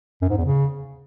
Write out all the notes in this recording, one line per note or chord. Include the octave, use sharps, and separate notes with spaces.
F#2
G#2
E2
C#3